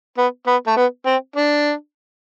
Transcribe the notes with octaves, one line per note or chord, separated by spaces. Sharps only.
B3
B3
A3
B3
C4
D4